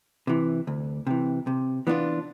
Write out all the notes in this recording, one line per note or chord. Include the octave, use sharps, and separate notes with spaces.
C3 E3
D2
C3 E3
C3
E3 B3 D4 F4